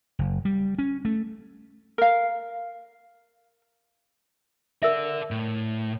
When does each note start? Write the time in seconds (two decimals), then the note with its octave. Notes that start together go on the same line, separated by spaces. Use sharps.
0.19 F#1
0.45 G3
0.79 C#4
1.05 A3
1.98 A#4 F5
4.83 A4 A#4 D5 E5
5.31 A2